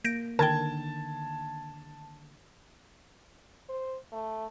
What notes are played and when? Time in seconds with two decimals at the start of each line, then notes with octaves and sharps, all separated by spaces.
0.05 A#3 G6 A#6 D7
0.39 D3 D#3 A#4 G5 A5 G#6
3.69 C5
4.12 A3